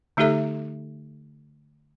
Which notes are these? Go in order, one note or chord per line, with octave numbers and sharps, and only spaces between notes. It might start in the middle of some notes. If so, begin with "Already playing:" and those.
D3 A3 D#4 G4 A4 E5